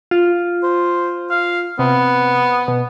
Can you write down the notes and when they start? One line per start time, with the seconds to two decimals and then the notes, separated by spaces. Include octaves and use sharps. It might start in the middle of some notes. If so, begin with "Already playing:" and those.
0.11 F4
0.63 C5
1.30 F5
1.79 C3 B3
2.68 B2